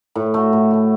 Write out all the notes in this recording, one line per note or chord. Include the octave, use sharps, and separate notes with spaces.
A2
A3 F#4
A2
A3 F#4